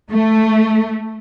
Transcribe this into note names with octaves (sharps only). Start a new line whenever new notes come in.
A3